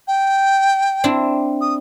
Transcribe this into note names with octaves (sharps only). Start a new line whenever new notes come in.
G5
C4 D4 E4
D#6